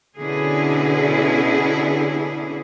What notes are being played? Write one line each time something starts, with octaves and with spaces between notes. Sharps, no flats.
B2 D3 C#4 E4 G#4